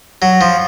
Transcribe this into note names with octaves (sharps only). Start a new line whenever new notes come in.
F#3
F3